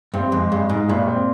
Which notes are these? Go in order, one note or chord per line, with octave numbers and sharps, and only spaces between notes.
G2 C4
F2 G#3
G2 G#3
G#2 G#3
G2 A#2
C4